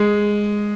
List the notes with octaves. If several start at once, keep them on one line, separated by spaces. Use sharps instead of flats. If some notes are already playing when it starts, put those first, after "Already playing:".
Already playing: G#3